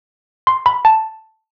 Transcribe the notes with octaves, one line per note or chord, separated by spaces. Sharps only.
C6
B5
A5